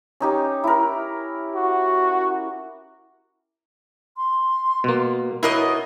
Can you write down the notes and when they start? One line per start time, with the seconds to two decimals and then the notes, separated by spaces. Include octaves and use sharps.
0.20 C#4 D#4 G4
0.64 E4 A#4
1.55 F#4
4.17 C6
4.84 B2 A#3
5.43 B2 E4 A#4 C#5 D#5